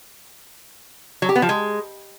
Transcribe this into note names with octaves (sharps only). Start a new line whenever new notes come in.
F#3
G4
B3
F3
G#3